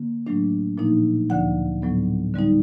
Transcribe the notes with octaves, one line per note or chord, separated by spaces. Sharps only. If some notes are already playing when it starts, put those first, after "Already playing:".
Already playing: D3 A#3
A2 F#3 A3 D4
A#2 F3 A#3 D#4
D2 D3 F3 F#5
A2 F#3 B3
D3 G3 C4 D#4